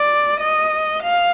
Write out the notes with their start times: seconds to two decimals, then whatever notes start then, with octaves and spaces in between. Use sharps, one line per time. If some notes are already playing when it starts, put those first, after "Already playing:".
Already playing: D5
0.40 D#5
1.03 F5